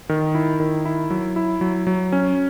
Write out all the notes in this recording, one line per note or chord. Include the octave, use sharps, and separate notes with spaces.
D#3
E4
D#3
E4
F#3
E4
F#3
F#3
C#4